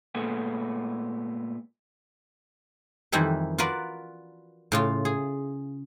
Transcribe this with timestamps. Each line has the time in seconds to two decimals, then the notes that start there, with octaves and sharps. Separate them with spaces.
0.15 A#2 G#3 A3 B3
3.12 F2 D#3 E3 G3 E4 B4
3.58 F4 F#4 A#4 B4 D5
4.72 A2 C#3 F4
5.05 G#4